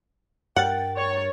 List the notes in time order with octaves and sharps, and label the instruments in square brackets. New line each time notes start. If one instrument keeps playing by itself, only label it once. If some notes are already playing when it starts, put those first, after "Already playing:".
[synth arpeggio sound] G2 A#4 A6 [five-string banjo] F#5 [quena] G5
[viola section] C#5